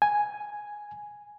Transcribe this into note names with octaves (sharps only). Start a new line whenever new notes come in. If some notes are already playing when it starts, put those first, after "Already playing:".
G#5